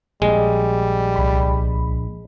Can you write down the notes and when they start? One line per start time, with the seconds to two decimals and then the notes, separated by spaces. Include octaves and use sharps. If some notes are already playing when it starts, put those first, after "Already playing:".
0.22 A#1 G3 G#3
1.16 C2 B5